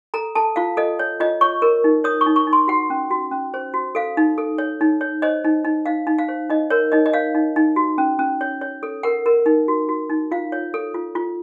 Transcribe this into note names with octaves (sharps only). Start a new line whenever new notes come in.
A4 A#5
A4 A5
F4 F5
A4 D#5
C#5
F4 D#5
C#5 C#6
A#4
D#4
C#5 D#6
C#6
D#4
C#6
D#4
C6
F#4 F#5
C#4
F#4
C#4
C5
F#4
A4 F5
D#4
A4
C#5
D#4
C#5
C5 D#5
D#4
D#4
D#4 F5
D#4
F5
C5
D#4 D#5
A#4 C#5
D#4 D#5
D#5
C#5 F5
D#4
D#4
F#4
C#4
C#4
C#5
C#5
A4
A#4 F#5
A#4
D#4
F#4
F#4
D#4
F4 F5
C#5
A4
F4
F4